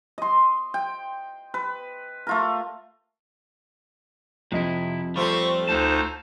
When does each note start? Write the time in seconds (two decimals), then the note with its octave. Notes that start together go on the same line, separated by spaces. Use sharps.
0.18 D#5 C6
0.74 G5
1.54 B4
2.27 A3 F4 A#4
4.52 F2 C3 E4 D#5
5.16 G3 A3 C4 F4 C#6
5.69 D2 D#4 C5 A5